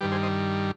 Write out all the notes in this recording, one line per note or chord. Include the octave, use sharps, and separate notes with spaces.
G2 D#3 G3 G4 B4
G#4 C5
C5 D#5